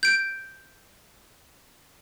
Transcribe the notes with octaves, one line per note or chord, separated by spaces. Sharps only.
G6 D7